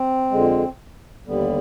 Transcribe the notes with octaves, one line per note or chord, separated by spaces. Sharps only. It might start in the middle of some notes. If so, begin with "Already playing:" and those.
Already playing: C4
F2 D3 G#3
D#2 D3 G3 B3